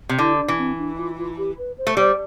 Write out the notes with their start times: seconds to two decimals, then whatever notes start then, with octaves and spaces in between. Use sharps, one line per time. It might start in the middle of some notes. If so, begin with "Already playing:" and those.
0.09 C3
0.18 D3 E4
0.38 D4
0.48 E3
0.58 C4
0.78 D4
0.98 F4
1.17 F4
1.37 G4
1.58 B4
1.78 C5
1.87 A3
1.97 G3 C5